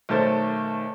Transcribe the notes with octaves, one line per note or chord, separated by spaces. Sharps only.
B1 D#3 A3 C5 A6